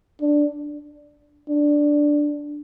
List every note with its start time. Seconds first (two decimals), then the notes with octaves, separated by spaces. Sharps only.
0.21 D4
1.49 D4